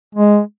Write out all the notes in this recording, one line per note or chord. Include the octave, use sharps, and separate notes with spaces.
G#3